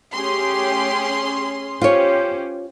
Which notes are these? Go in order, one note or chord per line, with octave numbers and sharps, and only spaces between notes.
A3 C#4 G4 G#4 C6
C#4 F4 G4 C5 C#5